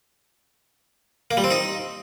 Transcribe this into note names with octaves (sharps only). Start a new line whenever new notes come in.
A#3
G3
C4
D#4